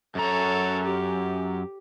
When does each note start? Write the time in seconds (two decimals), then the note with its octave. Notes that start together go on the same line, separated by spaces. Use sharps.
0.15 F#2 A4 C#5 A#5
0.83 G4